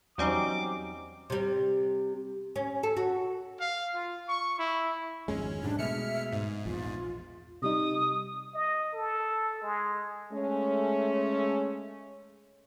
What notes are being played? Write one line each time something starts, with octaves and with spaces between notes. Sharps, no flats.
E2 F#3 G3 C4 C#4 D#4 D6
C3 G3
C#4
A4
F#4
F5
F4
C#6
E4
G#1 F2 G#3 C#4
G#2 C3 G3 D4
B2 G#3 A3 E5 F6 C#7
G#2
A#1 E2 F4
C3 G3 D#4 D#6
D#5
A4
G#3
G#3 A3 C#4